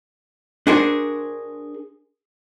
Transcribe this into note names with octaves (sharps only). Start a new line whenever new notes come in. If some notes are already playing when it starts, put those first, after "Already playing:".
D4 F#4 G#4 A#4 C5